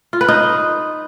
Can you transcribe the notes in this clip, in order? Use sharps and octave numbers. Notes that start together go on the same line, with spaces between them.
F4
B4
D#4